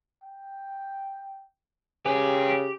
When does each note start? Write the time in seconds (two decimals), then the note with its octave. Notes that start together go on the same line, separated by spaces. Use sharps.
0.23 G5
2.06 C#3 G4 B4 G5 G#5